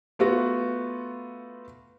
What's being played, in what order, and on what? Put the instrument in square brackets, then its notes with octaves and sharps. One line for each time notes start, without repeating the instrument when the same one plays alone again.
[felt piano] A3 B3 F4 F#4